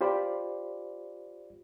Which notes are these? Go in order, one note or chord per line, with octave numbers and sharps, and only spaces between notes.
F4 G4 C5 D5 B5